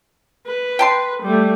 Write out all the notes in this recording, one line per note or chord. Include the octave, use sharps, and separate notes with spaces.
B4
G5 A5 C6
G3 A3